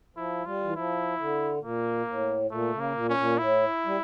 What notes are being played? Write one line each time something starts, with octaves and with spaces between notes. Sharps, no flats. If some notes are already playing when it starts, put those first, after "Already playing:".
F3 E4
G3 F4
E3
F3 E4
D3
A#2 A#3
A2
A#2 A3
C#3
A#3
A#2
C#4
A#2
A2 E4
G3